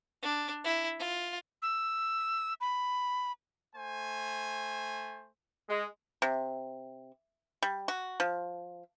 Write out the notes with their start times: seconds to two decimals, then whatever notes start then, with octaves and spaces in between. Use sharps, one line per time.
0.23 D4
0.64 E4
0.99 F4
1.62 E6
2.61 B5
3.75 A3 C5 G#5
5.69 G#3
6.22 C3
7.62 G3
7.88 F#4
8.20 F3